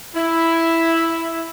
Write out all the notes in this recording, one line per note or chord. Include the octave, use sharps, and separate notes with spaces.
E4